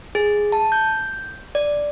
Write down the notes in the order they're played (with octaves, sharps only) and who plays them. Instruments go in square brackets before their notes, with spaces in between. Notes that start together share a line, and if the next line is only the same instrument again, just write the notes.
[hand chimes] G#4
A5
G6
D5